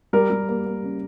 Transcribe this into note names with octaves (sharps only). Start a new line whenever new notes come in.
G3 A#4
G3
A#3
A#3
C#3